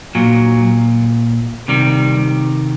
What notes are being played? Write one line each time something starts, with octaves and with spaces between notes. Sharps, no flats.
A#2 F#3
C3 D#3 G3